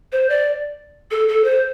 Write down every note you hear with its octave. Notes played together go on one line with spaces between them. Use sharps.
C5
D5
A4
A4
C5